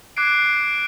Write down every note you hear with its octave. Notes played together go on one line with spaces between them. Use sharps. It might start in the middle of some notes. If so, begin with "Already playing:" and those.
D6 F#6 G#6 C7 D7